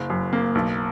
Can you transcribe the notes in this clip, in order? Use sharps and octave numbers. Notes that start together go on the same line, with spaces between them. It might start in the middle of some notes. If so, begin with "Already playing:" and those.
Already playing: F#1
F#2
A#3
B1